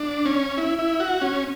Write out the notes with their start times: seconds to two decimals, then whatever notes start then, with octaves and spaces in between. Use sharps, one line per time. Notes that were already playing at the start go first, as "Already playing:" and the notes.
Already playing: D4
0.25 C#4
0.57 E4
0.79 E4
1.00 F#4
1.22 C#4